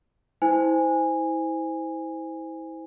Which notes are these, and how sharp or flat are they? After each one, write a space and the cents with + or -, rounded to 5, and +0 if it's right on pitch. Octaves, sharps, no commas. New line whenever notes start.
E4 -30 C5 -15 G#5 -15